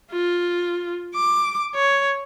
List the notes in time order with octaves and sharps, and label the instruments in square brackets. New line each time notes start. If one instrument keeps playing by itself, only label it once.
[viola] F4
D6
C#5